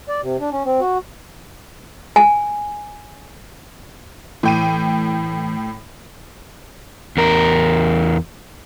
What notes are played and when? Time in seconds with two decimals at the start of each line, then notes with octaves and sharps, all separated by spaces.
0.09 D5
0.22 C3
0.40 D4
0.52 C#4
0.65 C4
0.81 F#4
2.16 G#5
4.43 A2 E3 G5 D#7
7.17 E2 A#4